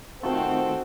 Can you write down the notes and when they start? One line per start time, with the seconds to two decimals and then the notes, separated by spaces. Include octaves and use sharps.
0.23 D#3 A3 C4 D#4 F4 F#4 A4